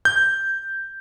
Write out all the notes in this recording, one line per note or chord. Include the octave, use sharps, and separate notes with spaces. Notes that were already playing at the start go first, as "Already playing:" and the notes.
G6